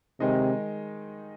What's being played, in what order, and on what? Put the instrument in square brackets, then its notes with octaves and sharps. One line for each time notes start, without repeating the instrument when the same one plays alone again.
[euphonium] C3 [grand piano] D#3 G#3 D#4